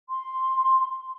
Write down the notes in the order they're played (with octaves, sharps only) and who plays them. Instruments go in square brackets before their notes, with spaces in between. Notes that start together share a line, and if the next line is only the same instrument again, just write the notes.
[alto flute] C6